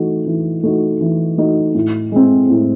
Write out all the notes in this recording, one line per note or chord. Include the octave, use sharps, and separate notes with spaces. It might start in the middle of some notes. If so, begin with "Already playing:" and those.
Already playing: E3 A3 D#4 F#4
E3
A3 D#4 F#4
E3
A3 D#4 F#4
A2
G#3 C4
A2